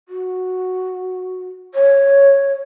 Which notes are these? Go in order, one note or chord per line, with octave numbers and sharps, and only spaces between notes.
F#4
C#5